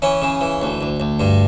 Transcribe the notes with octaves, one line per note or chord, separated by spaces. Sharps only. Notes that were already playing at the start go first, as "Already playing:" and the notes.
E3 C#4
C#3
E3
D2
D2
D2
G2